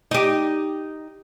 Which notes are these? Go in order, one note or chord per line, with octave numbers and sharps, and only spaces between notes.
D#4 G4